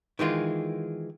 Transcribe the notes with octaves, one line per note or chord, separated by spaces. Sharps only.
D#3 E3 G#3 F4